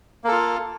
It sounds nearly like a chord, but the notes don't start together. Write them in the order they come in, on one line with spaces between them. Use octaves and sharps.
A#3 A4 F4